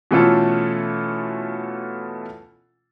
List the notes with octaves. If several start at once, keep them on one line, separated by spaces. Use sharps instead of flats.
B2 E3 A3 C#4 F4 A4